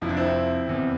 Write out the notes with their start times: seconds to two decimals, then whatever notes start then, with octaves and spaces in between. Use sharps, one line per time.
0.01 F1 F2 C3 F3 E4
0.09 D4
0.17 C4 E4
0.67 F1 E2 C3